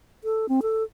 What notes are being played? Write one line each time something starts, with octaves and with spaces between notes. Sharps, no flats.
A4
C4
A4